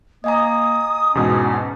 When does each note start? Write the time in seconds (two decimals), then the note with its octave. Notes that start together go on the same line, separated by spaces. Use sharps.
0.24 A#3 D#5 G#5 A#5 D#6
1.15 E2 G#2 B2 C#4